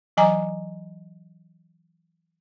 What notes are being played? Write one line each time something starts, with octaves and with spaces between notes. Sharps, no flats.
E3 F#3 D#5 G#5 A#5 D6